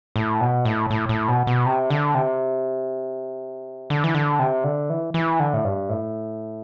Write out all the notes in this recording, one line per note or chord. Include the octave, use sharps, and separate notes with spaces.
A2
B2
A2
A2
A2
B2
B2
C3
D3
C3
D3
E3
D3
C3
D3
E3
E3
D3
A2
G2
A2